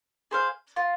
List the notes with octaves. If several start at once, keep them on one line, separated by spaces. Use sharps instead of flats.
G#4 C5 F5
F4